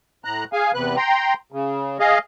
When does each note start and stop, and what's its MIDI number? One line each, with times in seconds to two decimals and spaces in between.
0.25 0.44 45
0.25 0.44 82
0.25 0.44 90
0.53 0.71 68
0.53 0.71 77
0.53 0.71 80
0.74 0.96 40
0.74 0.96 48
0.74 0.96 71
0.74 0.96 90
0.97 1.34 79
0.97 1.34 82
0.97 1.34 84
1.52 1.98 49
2.00 2.18 68
2.00 2.18 75
2.00 2.18 77